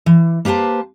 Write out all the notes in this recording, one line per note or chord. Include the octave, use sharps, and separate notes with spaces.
E3
A#3 G4 B4 C5 A5